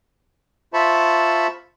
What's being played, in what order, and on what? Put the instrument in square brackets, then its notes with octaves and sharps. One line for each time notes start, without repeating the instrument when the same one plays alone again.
[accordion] F4 C5 E5 A5 B5 C#6